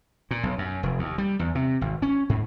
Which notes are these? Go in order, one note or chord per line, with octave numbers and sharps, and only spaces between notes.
A#2
B1
F#2
F1
D#2
G3
E2
C3
G#1
C#4
G#2